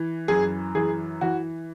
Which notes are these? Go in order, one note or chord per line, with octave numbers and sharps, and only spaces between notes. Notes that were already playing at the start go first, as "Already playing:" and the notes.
Already playing: E3
F#2 G#4
E3 G#4
E3 F#4